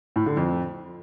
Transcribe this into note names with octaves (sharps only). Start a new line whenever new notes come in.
A2
D3
F2